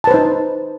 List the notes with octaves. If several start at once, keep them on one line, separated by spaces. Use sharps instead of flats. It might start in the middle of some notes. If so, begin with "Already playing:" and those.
D#4 B4 C5 A5